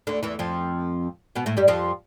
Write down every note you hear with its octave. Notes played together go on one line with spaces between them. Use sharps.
D2 D3
E2 E3
F2 F3
B2 B3
A2 A3
G2 G3
F2 F3